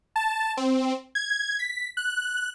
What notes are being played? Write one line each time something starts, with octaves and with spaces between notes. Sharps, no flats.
A5
C4
G#6
B6
F#6